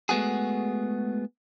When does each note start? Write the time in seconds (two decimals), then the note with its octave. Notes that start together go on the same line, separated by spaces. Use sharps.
0.09 G#3 A3 B3 F#4 G#4